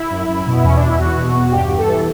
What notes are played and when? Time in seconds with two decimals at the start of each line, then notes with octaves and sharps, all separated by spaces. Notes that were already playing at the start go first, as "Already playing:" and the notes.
Already playing: E4
0.10 F#2
0.28 F#2
0.46 B2
0.52 B3
0.63 E2 C#4
0.76 D4
0.81 E2
0.87 E4
0.98 E2 F#4
1.16 B2
1.34 E2
1.52 G2 G4
1.69 G2
1.78 A4
1.87 E3